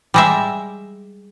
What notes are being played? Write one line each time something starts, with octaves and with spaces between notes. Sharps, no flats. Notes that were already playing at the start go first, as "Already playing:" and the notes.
G3 G#3 E5